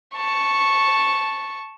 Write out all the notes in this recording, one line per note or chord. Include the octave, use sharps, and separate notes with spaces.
A5 C#6